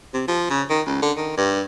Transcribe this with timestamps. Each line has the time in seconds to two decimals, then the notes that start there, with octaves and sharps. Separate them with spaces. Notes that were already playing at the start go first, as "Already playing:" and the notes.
0.14 C3
0.28 F3
0.50 C#3
0.70 D#3
0.87 C#2
1.02 D3
1.17 D#3
1.37 G2